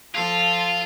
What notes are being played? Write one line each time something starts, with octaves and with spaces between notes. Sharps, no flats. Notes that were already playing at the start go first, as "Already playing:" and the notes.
F3 F4 A4